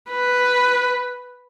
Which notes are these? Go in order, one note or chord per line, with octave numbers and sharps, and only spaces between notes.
B4